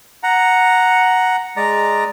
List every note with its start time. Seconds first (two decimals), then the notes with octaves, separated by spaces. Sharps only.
0.23 F#5 A#5
1.56 G#3 D5 A#5